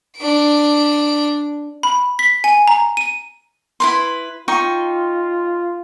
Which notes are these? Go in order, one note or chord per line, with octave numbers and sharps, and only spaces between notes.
D4 D7
B5
B6
G#5
A#5
D#7
E4 B4 C6
D#4 F4 G5 C#6